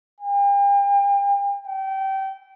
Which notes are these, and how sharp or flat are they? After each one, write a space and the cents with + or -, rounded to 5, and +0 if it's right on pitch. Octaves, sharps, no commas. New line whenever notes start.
G5 +40
G5 -25